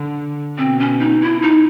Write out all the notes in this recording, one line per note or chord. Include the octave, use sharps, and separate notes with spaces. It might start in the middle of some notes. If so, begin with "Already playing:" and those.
Already playing: D3
B2 C4
C#4
D#4
E4
D#4